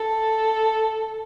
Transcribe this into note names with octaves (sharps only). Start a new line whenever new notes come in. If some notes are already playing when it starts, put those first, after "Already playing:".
Already playing: A4